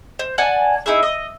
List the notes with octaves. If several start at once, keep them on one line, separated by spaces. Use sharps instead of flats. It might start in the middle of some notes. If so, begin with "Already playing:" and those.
C5
D5 F#5 G#5 A5
D#4 E4 G#4 E5
D#5